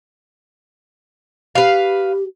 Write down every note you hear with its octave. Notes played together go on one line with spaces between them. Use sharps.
G4 B4 F5